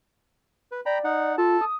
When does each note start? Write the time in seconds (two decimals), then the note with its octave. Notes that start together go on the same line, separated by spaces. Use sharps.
0.72 B4
0.86 D5 G5 A#5 B5
1.04 D#4 F#5
1.38 F4 A4 A5
1.61 D#6